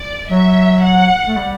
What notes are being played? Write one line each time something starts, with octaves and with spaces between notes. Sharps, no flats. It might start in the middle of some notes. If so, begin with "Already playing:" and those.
Already playing: D5
F#3 E5
F#5
A3
G3